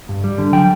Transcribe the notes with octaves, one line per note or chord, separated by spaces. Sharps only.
G2
G3
D3
F#3 G5